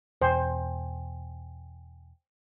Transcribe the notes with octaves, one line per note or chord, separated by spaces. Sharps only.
E2 B2 C5 G5 G#5